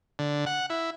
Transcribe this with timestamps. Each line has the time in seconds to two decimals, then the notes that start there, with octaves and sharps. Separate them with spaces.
0.19 D3
0.46 F#5
0.70 E4